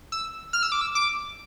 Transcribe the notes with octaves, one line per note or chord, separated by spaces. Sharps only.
E6
F6
E6
D6
E6
D6